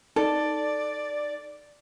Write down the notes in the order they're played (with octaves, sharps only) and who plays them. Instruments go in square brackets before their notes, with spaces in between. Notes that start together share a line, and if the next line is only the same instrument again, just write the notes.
[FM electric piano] D#4 [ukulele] A4 [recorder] D5